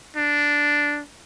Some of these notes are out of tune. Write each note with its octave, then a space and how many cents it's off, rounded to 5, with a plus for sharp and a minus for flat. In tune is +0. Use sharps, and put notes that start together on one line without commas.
D4 -5